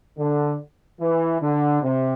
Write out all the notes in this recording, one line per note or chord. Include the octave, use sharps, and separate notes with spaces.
D3
E3
D3
C3